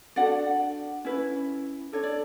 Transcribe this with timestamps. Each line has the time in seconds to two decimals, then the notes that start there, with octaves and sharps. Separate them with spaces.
0.16 D4 F#4 A4 D5 F#5
1.05 C#4 E4 B4
1.92 D4 A4 C#5
2.04 D5